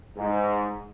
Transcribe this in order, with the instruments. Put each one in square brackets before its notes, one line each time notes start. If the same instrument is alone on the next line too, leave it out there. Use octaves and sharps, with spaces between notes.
[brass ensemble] G#2